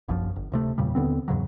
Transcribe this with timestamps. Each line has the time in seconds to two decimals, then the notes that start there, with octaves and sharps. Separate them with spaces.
0.08 F1 A#1 F#2 F3
0.36 G1
0.52 D1 C3 A3
0.78 E2 A#2 C#3 G3
0.95 D#2 D3 B3 C4
1.28 E2 G#2 C#3 F#3